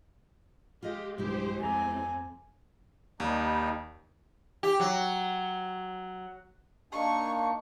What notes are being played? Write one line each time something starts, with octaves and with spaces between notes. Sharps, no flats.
G#3 F4 G4 D#5
B1 G2 D#3 G#3 E4 G4 C5
F2 A3 C4 G#5 A#5 D6
D#2 G3 D#4
G4
F#3
A#3 D4 D#4 C#6